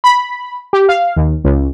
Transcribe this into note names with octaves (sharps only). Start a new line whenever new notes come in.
B5
G4
F5
D#2
C#2